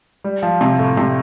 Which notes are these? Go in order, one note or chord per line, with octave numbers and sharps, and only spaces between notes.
G3
F3
C3
A2
C3